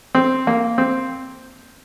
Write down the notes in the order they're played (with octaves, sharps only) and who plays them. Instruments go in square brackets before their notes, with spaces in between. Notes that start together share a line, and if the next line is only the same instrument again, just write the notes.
[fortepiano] C4
A#3
C4